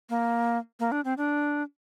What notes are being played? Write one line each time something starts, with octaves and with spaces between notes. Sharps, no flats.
A#3
A#3
D4
C4
D4